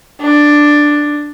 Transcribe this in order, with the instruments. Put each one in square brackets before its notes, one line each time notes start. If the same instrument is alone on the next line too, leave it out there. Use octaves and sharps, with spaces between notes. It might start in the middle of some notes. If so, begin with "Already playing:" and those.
[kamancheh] D4